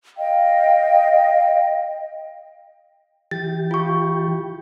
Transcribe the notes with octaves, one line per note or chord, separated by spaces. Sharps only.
D#5 F5 G5
E3 G4 A6
F4 C#6